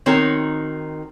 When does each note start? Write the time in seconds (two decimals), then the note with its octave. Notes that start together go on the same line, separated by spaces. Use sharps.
0.06 D#3 C4 D#4 F#4 A#4 C#5